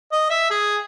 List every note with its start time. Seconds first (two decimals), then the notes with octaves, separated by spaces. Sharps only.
0.12 D#5
0.30 E5
0.50 G#4